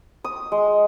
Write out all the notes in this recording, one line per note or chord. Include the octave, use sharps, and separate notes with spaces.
D#6
G#3